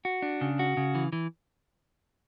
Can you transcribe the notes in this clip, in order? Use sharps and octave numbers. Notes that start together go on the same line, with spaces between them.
F#4
D4
C#3
F#4
C#3
E3
E3